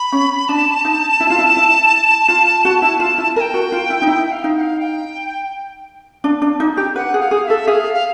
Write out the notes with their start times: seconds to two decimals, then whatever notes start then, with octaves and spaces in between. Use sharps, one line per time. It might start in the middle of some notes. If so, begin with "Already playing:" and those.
Already playing: B5
0.12 C#4
0.49 D4 A5
0.85 D#4
1.20 E4
1.30 F4
1.39 E4
1.56 E4
2.28 F4
2.65 F#4
2.82 E4
3.00 F4
3.18 E4
3.36 A#4 A5
3.41 G5
3.54 F#4
3.72 F4
3.90 E4
4.02 D#4
4.07 E4 G5
4.32 F5
4.44 D#4
4.57 F#5
4.61 F5
4.80 G5
6.24 D4
6.42 D4
6.60 D#4
6.77 G4
6.96 B4 F#5
7.14 G#4
7.20 F5
7.31 G#4
7.43 F5
7.48 A4 E5
7.67 G#4 F5
7.94 F5